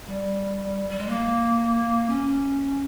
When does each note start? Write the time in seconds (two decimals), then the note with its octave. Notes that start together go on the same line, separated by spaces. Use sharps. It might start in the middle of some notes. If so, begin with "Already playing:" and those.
0.07 G3
0.90 G3
0.99 G#3
1.08 A#3
2.09 C#4